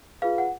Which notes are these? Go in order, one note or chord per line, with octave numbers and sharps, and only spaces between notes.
F4 G#4 B4 F5
F#5